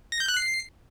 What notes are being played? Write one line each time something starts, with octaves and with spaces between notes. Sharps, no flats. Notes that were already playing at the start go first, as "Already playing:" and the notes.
A#6
G6
F#6
C7